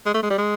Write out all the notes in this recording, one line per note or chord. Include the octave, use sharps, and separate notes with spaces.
G#3
A3
G#3
G3
G#3